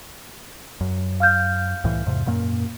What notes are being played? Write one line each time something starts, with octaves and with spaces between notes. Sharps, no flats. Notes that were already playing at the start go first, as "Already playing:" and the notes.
F#2
F5 F6 G6
C2 A2 E3
E2 G#2 C3
F#2 A#2 A#3